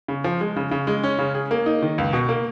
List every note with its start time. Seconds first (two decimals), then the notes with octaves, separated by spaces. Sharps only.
0.08 C#3
0.24 F3
0.41 G#3
0.56 C#3
0.71 C#3
0.87 G#3
1.04 C#4
1.19 C#3
1.34 G#4
1.51 A#3
1.66 D#4
1.82 D#3
1.98 C#2
2.13 B2
2.29 A#3